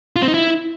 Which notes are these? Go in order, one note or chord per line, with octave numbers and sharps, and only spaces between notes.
F4
C4
D#4
E4